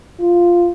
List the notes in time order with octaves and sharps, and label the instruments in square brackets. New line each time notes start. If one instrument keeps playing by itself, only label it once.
[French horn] F4